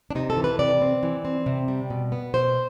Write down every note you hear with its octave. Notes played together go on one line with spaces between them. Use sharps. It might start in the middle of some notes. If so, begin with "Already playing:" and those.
D4
C3 D#4
A4
E3
B4
C3 D5
C4
E3
C4
C3
G3
B2
B3
B2 C5